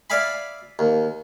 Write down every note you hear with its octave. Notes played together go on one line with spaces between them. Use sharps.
D5 E5 F5 G#5 B5
D#2